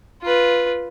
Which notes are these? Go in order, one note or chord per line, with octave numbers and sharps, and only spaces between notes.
F4 B4